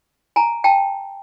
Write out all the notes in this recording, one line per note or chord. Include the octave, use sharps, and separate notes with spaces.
G#5 A#5
G5 A5